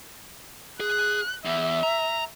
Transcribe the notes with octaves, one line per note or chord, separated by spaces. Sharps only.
G#4 F#6
E2 E5
A#5